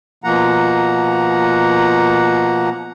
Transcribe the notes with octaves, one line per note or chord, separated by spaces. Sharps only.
B2 F3 A#3 F#5 A#5